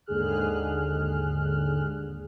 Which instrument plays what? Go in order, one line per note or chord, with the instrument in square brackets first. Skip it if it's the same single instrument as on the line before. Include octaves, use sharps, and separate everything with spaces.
[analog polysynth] D#2 G#2 D3 G#4 F6 F#6